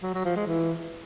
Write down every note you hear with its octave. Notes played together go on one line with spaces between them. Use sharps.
F#3
F#3
F3
G#3
E3